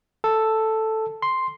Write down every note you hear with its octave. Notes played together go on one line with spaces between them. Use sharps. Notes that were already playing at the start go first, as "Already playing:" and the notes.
A4
C6